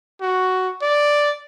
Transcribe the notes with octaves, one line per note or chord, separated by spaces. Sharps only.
F#4
D5